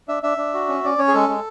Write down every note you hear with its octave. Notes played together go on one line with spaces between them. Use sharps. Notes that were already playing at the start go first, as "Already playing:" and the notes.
D4 E5
D4 E5
D4
F#4
C#4
C#4 D5
C#4 C#5
G#4
G#3 A4
G#3